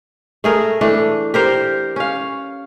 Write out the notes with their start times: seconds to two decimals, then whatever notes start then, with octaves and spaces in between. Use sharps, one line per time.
0.44 A3 G#4 A#4
0.81 E3 A3 D4
1.34 G4 A#4 C5
1.96 C#4 F5